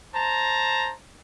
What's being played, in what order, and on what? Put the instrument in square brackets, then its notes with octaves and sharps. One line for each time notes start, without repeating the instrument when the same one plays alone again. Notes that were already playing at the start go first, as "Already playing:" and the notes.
[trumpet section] C5 A5 A#5